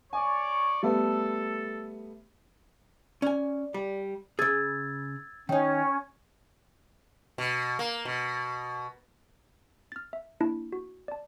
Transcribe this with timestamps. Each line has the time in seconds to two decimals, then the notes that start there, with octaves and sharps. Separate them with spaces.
0.13 C#5 D5 G#5 C#6
0.83 G3 A3 B3 A4
3.22 C#4 D5 G#5
3.74 G3
4.39 C#3 G#4 E6 G#6 A6
5.49 D#3 C#4 D#4 G5
7.38 B2
7.79 A#3
8.05 B2
9.92 F6 A6
10.13 E5
10.40 A#3 D4 E4 A5
10.72 F#4
11.08 D5 A5